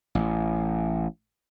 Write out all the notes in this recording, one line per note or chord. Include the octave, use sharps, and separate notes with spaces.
A1